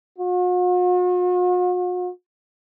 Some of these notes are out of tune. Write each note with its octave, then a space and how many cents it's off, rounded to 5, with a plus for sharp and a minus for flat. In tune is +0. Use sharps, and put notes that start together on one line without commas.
F#4 -45